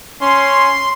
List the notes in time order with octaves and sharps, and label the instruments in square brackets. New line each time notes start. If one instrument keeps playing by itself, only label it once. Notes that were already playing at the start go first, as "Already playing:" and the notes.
[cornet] C#4 [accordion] C6